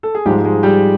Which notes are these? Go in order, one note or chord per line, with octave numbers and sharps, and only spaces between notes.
A4
G#4
G#2 F3 G3 G#3 G4
G#3 G#4
G3 G4